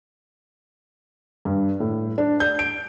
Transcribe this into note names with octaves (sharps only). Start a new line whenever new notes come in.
G2
A2
D4
G6
D7